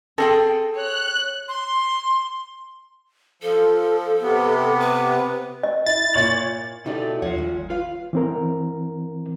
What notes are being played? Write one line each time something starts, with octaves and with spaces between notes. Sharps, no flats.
C4 G#4 A4 G5
C#5 F#6
C6
F3 A4
C3 B3
B4
D#5
E4 A6
A#2 C#5 F#7
B2 A3 D#4 E4 F#4 G4 A4 D5
D#2 F3 D4 F4 C#5 F#5
A#2 D#3 G3
G1
F4 B4 F5
E3 C4 A#4